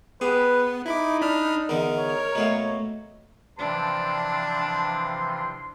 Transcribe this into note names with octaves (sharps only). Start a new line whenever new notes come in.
B3 G4 G#4 B4
D#4 E4 B5 D6
D4 B5 F6
E2 D3 D#3 A#4
C#5
B2 A3 A#3
C3 E3 F3 D4 A5 C6